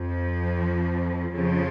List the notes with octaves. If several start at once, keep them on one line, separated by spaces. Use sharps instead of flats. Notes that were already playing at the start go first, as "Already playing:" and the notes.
Already playing: F2 F3
F2 C#3 F3